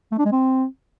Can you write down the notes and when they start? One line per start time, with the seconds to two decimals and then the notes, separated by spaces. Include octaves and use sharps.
0.12 A3
0.19 D4
0.25 G#3
0.32 C4